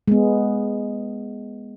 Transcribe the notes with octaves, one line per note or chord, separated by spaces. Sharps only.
G#3 B3